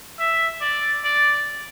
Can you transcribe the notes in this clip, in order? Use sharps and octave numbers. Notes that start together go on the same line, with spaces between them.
E5
D5
D5